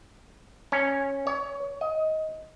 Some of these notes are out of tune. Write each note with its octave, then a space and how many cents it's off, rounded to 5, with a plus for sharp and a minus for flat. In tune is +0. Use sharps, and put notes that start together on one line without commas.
C#4 -10
C#5 +25
D#5 +15